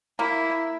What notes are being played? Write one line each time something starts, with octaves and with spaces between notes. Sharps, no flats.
A#3 E4